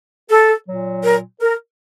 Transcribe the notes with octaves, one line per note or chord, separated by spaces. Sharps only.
A4
A#2 F#3
A#4
A#4